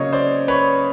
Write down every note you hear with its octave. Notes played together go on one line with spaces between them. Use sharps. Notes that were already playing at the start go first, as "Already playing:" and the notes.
Already playing: C#3 F#3 A#3 C#5 D#5
C5 D5
B4 C#5